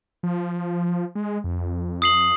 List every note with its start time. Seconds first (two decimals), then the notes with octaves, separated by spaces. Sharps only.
0.23 F3
1.15 G#3
1.44 F2
2.02 D#6 C7 F#7